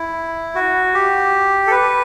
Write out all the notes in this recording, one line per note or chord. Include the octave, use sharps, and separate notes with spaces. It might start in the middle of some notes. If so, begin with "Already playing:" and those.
Already playing: E4
F#4
G4
A4
B4